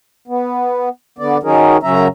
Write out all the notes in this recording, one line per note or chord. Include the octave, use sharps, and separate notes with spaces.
B3
D3 B3 D5
D#3 F#3 C#4 D#4 G#4 A#4
F#2 C#3 F#3 C#4 E5 A#5